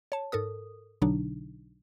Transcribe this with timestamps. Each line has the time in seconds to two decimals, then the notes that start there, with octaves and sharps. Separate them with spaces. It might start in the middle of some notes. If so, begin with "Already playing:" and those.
0.12 C#5 A5
0.32 G#2 A4 A#4 D#6
1.02 B1 B2 D3 F#3 D4 D#4